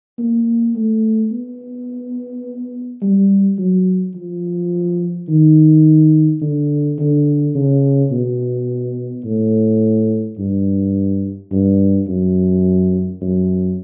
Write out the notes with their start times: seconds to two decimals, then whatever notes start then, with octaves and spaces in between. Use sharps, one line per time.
0.19 A#3
0.76 A3
1.32 B3
3.02 G3
3.59 F#3
4.16 F3
5.29 D#3
6.42 D3
6.99 D3
7.55 C#3
8.11 B2
9.25 A2
10.39 G2
11.51 G2
12.08 F#2
13.21 F#2